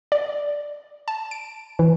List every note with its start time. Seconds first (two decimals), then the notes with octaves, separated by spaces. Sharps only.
0.12 D5
1.08 A5
1.31 D7
1.79 E3